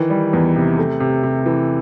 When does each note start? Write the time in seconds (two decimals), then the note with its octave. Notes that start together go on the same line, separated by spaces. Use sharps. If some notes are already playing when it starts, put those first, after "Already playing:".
Already playing: D#3 E3
0.10 G3
0.33 E2
0.56 C3
0.78 A3
1.00 C3
1.23 C3
1.46 E3